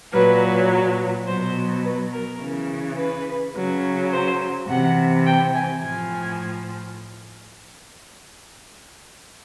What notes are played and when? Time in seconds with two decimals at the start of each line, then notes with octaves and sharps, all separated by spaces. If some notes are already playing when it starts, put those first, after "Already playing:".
0.12 A#2 F#3 B4
1.26 B2 F#3 C5
1.83 B4
2.12 A#4
2.40 C#3 E3
2.97 B4
3.54 C#3 F#3
4.11 C5
4.68 C3 E3 F#5
5.26 G5
5.54 G#5
5.83 A2 F3 G#5